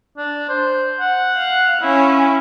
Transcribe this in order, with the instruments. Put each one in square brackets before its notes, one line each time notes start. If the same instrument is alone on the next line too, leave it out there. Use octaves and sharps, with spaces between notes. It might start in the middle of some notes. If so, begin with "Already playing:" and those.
[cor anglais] D4
C5
F#5
[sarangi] F5
[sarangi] C#4 [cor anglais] E4